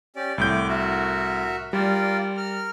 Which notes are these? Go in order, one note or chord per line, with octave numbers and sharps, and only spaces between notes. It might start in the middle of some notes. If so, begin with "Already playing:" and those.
C#4 G4 D5
C2 A2 D6 G6
F#4 A#4 E5
G3 F4 A#4 D5
A#4 F6